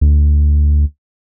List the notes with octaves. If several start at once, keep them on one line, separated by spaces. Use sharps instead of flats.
D2